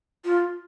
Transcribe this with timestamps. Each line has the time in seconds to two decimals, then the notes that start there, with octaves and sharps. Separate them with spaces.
0.25 F4